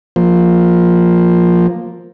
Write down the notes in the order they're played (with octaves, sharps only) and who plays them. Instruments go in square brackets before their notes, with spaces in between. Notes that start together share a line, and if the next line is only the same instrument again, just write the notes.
[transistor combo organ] F3 A#3